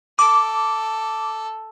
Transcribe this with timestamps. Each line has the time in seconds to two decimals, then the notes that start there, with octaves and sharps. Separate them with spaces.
0.19 A4 D6